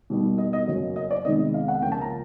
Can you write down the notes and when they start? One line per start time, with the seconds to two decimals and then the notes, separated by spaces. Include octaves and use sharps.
0.10 B2 G3 A#3 D#4
0.38 D#5
0.53 D#5
0.68 F#2 C#3 F#3 A#3 C#4
0.96 D#5
1.11 D5
1.25 C3 D#3 G#3 B3 D#4 D#5
1.39 D#5
1.54 F5
1.68 F#5
1.82 C#2 C#3 F3 A#3 G5
1.92 A5
2.01 A#5